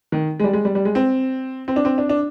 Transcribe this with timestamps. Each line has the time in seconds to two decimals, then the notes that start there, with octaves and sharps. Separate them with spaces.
0.12 D#3
0.40 G#3
0.44 G3
0.53 G#3
0.65 G3
0.75 G3
0.85 G#3
0.95 C4
1.68 C4
1.76 D4
1.85 C4
1.98 D4
2.09 D4